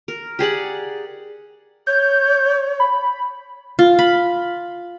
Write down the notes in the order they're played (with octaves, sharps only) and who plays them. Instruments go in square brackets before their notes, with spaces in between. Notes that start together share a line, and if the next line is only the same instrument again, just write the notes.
[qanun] A#4
G4 G#4 D5 F#5
[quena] C#5 [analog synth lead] G6
[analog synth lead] B5
[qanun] F4
B5